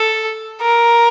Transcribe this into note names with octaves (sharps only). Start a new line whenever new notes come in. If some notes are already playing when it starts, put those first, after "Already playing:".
Already playing: A4
A#4